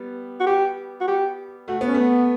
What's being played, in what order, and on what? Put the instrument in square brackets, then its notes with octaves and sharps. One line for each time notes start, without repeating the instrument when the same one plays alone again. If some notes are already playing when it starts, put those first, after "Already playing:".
Already playing: [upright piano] G3 B3
[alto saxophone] F#4
G4
F#4
G4
[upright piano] A3 [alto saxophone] F#4
[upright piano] B3
[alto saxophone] C#4
[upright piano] A3 [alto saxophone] B3